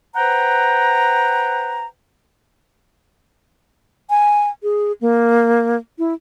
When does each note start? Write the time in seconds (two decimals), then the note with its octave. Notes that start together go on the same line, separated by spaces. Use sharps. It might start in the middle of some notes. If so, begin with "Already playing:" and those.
0.15 B4 C5 F#5 G5 A#5
4.10 G#5
4.63 G#4
5.01 A#3
5.99 E4